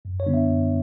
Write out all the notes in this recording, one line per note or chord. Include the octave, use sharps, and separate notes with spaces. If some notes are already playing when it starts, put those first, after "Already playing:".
F#2
C#5
D3 G3 B3 D4
E5
F#2